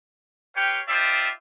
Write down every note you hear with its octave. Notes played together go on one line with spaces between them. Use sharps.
G4 B4 C#5 F5 G5
D#4 F4 G4 C5 D5 E5